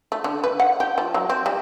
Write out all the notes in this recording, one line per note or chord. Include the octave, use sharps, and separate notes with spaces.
A3
D3
B4
F#5
G4
F3
F#3
C4
G3